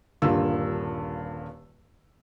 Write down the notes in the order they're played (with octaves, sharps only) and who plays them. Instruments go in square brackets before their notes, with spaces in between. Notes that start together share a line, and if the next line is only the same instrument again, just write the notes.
[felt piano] D#1 G2 D3 A#3 F4 E6